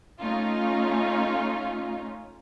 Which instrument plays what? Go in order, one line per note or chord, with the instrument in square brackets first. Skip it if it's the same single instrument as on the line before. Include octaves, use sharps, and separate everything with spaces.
[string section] A3 C#4 D#4 F4